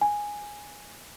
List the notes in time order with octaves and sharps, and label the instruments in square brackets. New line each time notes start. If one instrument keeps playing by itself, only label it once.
[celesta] G#5